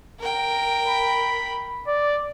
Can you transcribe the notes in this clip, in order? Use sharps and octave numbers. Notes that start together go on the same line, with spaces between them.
A#4 G5
B5
D5